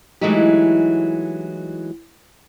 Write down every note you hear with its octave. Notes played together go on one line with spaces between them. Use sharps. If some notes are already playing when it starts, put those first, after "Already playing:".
E3 F#3 G#3 A3 D#4 G4